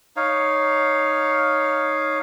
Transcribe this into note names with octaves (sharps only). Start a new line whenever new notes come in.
D#4 C#5 F5